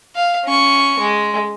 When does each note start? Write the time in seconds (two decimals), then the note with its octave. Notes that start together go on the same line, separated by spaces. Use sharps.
0.15 F5
0.45 C#4 C#6
0.99 G#3